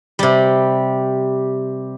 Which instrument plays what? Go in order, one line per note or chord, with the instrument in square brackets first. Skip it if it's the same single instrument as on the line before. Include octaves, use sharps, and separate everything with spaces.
[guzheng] C3 G3